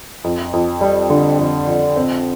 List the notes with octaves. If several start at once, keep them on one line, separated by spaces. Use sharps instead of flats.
F2
F2
G3
D3
F2
F2
C4